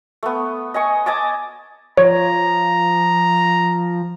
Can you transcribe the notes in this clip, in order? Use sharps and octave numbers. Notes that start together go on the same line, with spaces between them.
A3 B3
D#5 G#5 C#6
D#5 G#5 A5 D6
F3 C#5 A#5